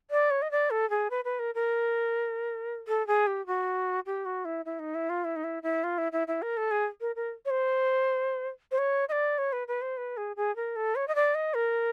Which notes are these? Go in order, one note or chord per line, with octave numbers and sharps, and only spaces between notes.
D5
C#5
D#5
D5
A4
G#4
B4
B4
A#4
A#4
A4
G#4
G4
F#4
G4
F#4
E4
E4
D#4
E4
F4
E4
D#4
E4
E4
F4
E4
E4
E4
A#4
A4
G#4
A#4
A#4
C#5
C5
C5
C#5
D#5
D5
C#5
B4
B4
C5
B4
G#4
G#4
A#4
A4
C#5
D#5
D5
D#5
A#4